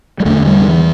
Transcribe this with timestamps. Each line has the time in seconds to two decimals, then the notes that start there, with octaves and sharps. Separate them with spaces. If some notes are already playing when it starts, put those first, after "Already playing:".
0.20 G3
0.25 E2 D3 A3
0.47 G3
0.60 D3
0.68 E3